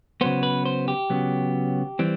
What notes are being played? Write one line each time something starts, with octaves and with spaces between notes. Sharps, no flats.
C#3 F#3 B3 C5
B4
C5
G4
C#3 F#3 B3
E3 G3 C4